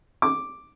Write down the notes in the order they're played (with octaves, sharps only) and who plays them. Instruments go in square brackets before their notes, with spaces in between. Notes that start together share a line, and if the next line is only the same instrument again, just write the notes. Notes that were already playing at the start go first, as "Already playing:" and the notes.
[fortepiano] D6